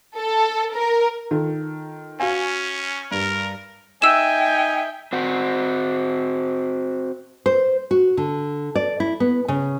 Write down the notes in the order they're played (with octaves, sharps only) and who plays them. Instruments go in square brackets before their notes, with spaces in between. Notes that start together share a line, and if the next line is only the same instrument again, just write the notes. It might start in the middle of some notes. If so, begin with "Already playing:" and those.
[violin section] A4
A#4
[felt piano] D#3 F4 A4
[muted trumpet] C#4 [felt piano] F#4 F5 G#5
[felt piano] G2 [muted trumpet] A#4
[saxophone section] D#4 [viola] E5 G5 [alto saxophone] G#5 [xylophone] E6 E7
[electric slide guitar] C4 F#4
[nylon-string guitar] C5
F#4
D3
D5
E4
B3
C#3